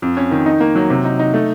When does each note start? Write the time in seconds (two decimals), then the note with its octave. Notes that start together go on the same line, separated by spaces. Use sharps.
0.02 F2
0.17 C#4
0.31 D#3
0.46 D#4
0.60 A#3
0.76 F#3
0.90 C3
1.05 D#4
1.19 D#4
1.34 A3